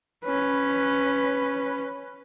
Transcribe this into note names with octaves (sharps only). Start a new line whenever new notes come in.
C#4 B4